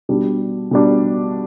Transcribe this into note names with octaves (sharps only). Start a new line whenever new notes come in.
B2 G3 D4
B2 G3 D4